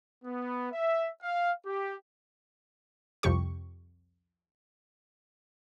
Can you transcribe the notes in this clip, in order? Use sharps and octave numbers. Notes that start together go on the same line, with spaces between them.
B3
E5
F5
G4
C2 F2 C3 G4 C#6